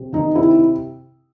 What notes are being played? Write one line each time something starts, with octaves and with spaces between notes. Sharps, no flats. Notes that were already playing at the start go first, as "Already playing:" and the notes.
Already playing: C3
D#3 D#4
C3 E4